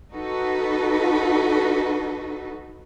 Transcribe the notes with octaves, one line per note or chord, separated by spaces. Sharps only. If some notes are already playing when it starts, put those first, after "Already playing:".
D#4 F#4 A4 B4